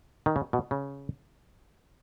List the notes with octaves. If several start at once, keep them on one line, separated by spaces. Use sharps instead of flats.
D#3
C#3
B2
C#3